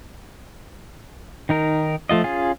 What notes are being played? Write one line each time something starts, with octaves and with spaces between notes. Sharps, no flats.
D#3 D#4 A#4
F3 A3 F4 D#5
C#4 F4 G#4